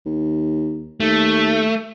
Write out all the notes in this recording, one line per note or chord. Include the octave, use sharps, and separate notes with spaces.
D#2
D#2 A3